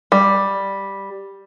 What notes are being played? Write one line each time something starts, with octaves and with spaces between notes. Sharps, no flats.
G3